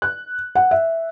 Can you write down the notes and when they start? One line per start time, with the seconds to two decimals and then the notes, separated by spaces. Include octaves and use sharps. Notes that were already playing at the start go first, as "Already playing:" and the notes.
0.02 F#6
0.55 F#5
0.71 E5